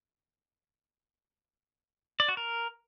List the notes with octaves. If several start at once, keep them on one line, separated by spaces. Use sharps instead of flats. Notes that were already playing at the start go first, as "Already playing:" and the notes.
D5
F#4
A#4